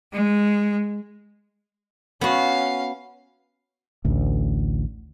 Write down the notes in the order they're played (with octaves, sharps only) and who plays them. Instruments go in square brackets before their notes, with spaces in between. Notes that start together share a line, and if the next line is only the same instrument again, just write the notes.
[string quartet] G#3
[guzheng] B3 F#4 [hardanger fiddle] C#4 F5
[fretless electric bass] A1 D2